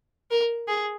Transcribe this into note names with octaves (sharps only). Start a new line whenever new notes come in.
A#4
G#4